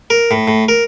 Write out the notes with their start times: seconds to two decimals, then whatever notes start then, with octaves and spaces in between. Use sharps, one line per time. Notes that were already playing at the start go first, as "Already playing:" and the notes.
0.10 A#4
0.31 A2
0.48 A2
0.68 A#4